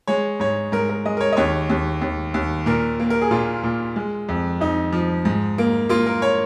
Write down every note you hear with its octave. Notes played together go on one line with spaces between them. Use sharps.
G#3 C#5
G#2 C#5
G#2 A#4
A#4
G#3 D#5
A#4
C#5
D#5
D#2 C#5
D#2
D#2
D#2
A#2 A#4
A#3
A#4
G#4
A#2 F4
A#2
G#3
F2
F2 D#4
F3
G#2
A#3
A#3 F4
A#4
C#5